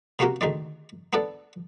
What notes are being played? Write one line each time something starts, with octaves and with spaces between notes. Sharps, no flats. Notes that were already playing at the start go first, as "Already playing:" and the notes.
C3 A#3 C#4 F#4 G4 A#4
D2 D#3 G#3 D5
B3 D4 A4 D5